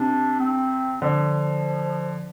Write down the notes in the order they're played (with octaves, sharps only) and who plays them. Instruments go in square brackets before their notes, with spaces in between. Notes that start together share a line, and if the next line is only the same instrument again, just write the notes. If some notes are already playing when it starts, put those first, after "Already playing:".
Already playing: [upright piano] C3 [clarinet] D4
[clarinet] C4
[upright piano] D3 [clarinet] F3